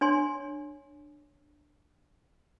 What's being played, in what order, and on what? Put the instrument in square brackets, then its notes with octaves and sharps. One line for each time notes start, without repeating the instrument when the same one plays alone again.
[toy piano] D4 C#5 G#5 C6